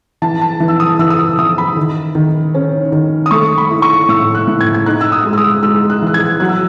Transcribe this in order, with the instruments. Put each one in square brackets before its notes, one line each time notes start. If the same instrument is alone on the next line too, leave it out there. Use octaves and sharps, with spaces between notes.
[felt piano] E3 A5
A5
E3
E6
D#6
E3 E6
D#6
E6
E3 D#6
B5
D#3
D#3
C#4
D#3
D#6
A3 C#6
B5
E4
C#6
A2 E6
F#6
A2
G#6
G#6
D#4 F#6
E6
D#6
G#3
E6
D#6
G#3 E6
F#6
E3 F#6
G#6
F#3 F#6
E6